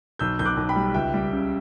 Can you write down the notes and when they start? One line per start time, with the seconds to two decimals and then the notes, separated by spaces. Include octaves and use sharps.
0.19 B1 E6 G6
0.39 B1 G6
0.45 D6 F#6
0.57 B1
0.69 G5 B5
0.76 G3
0.94 C#2 E5 G5
1.14 G3
1.32 C#3